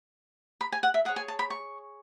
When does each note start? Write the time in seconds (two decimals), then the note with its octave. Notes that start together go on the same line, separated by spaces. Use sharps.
0.61 B5
0.72 G#5
0.83 F#5
0.94 E5
1.05 G#4 C#5 F#5
1.16 G#5
1.28 A5
1.39 B5
1.50 C#6